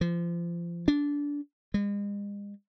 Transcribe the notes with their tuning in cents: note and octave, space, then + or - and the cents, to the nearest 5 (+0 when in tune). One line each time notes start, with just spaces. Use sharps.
F3 -30
D4 -20
G#3 -40